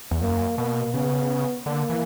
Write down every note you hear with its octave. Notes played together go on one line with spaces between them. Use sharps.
E2
F#2 A#3
B2 A#3
C#3 B3
D3 A#3
E3